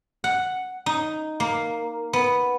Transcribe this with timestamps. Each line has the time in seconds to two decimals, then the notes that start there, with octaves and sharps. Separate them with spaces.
0.24 F#5
0.86 D#4
1.40 A#3
2.13 B3